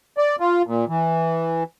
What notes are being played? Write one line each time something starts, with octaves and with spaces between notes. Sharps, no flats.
D5
F4
A#2
E3